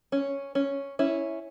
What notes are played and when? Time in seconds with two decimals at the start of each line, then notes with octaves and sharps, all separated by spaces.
0.12 C#4
0.55 C#4
0.99 C#4 E4